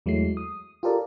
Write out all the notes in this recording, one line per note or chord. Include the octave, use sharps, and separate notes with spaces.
E2 F#3 G#3 A3 E4 C7
D#6
F4 G4 A4 A#4 D5